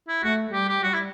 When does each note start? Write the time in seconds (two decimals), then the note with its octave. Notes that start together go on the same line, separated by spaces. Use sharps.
0.08 E4
0.23 A3 F#4
0.53 G3 G4
0.68 G4
0.83 G3 F#4
0.93 E4